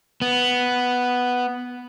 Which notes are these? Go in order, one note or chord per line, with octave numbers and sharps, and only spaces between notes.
B3